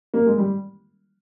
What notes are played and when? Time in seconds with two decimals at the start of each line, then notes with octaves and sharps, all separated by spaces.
0.14 A#3
0.26 G#3
0.38 G3